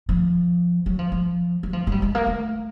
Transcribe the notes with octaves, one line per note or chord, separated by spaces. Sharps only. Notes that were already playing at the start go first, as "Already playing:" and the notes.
F3
F#3
F3
F3
F#3
F3
G#3
G3
G#3
A#3
A3